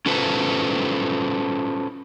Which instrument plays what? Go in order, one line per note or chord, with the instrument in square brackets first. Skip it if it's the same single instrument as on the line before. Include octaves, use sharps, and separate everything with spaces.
[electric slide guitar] C#4 F4 A4 B4 C5